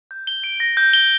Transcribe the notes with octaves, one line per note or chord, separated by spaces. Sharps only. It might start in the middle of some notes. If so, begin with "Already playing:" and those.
G6
G7
D7
A#6
G6
G7